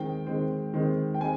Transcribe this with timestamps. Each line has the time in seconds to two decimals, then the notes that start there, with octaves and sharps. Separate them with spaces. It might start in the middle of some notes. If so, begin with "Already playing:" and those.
Already playing: D#3 G#3 C4 G5
0.27 D#3 G#3 C4
0.74 D#3 G#3 C4
1.14 G5
1.21 G#3 C4 G#5